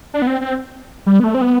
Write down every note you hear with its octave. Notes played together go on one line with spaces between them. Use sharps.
D4
B3
C4
C4
G3
B3
A3
C4
B3